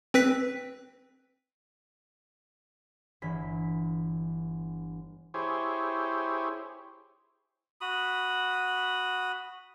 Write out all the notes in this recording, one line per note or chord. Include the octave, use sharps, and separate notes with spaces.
C4 B4 B6
G1 E3 B6
E4 G4 G#4 C5 C#5
F#4 B5 D#6